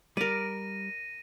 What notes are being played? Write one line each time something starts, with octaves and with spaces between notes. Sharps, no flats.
G3 A#4 D5 A#6 D#7